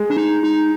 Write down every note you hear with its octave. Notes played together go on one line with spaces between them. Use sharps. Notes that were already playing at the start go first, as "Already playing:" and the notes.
Already playing: G#3
D4
D#4
D#4